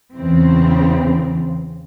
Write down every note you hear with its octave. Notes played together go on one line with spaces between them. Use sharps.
E2 C#3 E3 C4